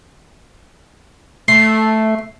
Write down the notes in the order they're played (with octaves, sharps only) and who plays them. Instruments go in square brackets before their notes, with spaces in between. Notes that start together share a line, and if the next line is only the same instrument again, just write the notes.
[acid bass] A3 [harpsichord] C6